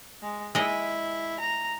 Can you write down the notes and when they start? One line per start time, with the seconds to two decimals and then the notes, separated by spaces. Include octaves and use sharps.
0.22 G#3
0.55 G#3 E4 D#5
1.40 A#5